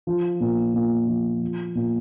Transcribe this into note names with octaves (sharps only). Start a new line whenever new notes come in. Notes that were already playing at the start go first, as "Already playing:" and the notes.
F3
A#2
A#2
F3
F3
A#2